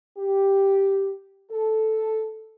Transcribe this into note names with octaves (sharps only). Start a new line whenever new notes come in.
G4
A4